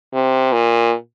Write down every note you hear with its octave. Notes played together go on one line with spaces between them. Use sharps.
C3
A#2